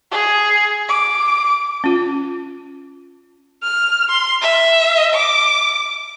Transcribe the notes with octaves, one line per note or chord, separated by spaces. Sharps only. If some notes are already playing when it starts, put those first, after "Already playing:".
G#4
D6
C#4 F4
F6
C6
E5
D6